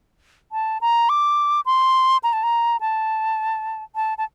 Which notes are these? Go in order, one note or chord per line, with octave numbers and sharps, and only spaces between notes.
A5
A#5
D6
C6
A#5
A5
A#5
A5
A5
A5